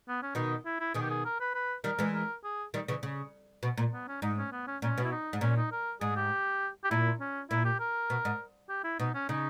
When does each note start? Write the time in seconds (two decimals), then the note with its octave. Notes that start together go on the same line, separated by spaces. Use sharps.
0.08 B3
0.22 C#4
0.35 B2 D#3 D#4
0.65 E4
0.80 E4
0.94 B2 D#3 G#4
1.02 G4
1.10 G#4
1.25 A#4
1.40 B4
1.55 B4
1.84 D#3 G3 A#4
1.99 E3 G#3
2.14 A#4
2.44 G#4
2.74 D#3 G3
2.88 C#3 E3
3.03 C#3
3.63 B2
3.78 A#2
3.93 B3
4.08 C#4
4.22 G#2 D#4
4.38 C#4
4.52 B3
4.67 C#4
4.82 A#2 C#4
4.98 B2
5.04 E4
5.12 D#4
5.33 G#2
5.41 A#2 C#4
5.57 D#4
5.72 A#4
6.01 G#2 G#4
6.16 G4
6.84 G4
6.90 A#2 E4
7.20 C#4
7.50 A#2 E4
7.65 G4
7.80 A#4
8.10 B2
8.25 G#2
8.69 G4
8.84 E4
8.99 B2 D#4
9.14 C#4
9.29 C#3 D#4